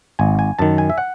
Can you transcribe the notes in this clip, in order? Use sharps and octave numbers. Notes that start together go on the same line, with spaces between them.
G#1 G#5
G#5
F#2 D#3 A5
G#5
E5
F#5